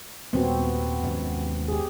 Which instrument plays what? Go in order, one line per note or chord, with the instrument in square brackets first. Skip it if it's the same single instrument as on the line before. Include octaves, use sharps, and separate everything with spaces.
[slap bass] D#2 A#2 G3 [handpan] B3 C4 F#4
[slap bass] D#2 G#2 C#4
[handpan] G4 G#4